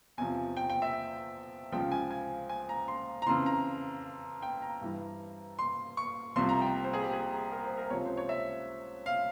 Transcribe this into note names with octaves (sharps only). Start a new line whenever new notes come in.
E2 C3 F3 G#5
G5
G5
E5
C#2 C#3 F3 G5
G#5
G#5
G#5
A#5
C6
A#5
F2 C#3 E3 C6
A#5
G5
A#5
G2 E3
C6
C#6
C2 C3 F3 C6
A#5
G5
C5
G#4
G4
G#4
A#4
C5
A#4
C#2 C3 F3 C#5
C5
C#5
E5
F5